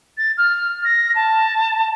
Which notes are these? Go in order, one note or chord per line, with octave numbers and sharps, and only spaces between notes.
A6
F6
A#6
A5